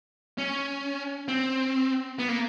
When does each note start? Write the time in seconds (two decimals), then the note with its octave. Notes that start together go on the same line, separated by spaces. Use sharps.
0.38 C#4
1.28 C4
2.19 B3
2.29 A#3